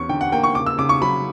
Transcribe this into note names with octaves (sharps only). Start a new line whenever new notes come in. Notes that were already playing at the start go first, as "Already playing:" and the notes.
Already playing: E2 C#4 C#6
D3 G5
F#5
A#3 G5
C#6
C#3 D6
E6
C#3 D6
C#6
F#3 B5